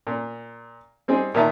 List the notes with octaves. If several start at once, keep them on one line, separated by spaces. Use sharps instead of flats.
A#2
G3 C4 D#4 G#4
A#2 D#3 A#4 E5 A5